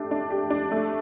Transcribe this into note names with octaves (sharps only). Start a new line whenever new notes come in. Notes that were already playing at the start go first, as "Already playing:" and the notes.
Already playing: A3 D4 G4
D4
G4
D4
A3